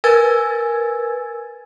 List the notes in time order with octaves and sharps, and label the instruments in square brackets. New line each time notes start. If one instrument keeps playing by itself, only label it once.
[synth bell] A#4 B4 G#5 E6 G#6 A6